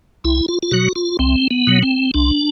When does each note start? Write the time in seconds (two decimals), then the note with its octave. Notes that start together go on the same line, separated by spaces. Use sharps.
0.24 C2 E4
0.48 F4
0.63 F4
0.71 B2 F#3 F#4
0.96 F4
1.19 C2 C4
1.51 B3
1.67 B2 F#3
1.83 C4
2.14 C2 D4